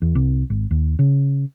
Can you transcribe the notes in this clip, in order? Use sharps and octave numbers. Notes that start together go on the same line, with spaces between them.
E2
C2
G#1
D#2
C#3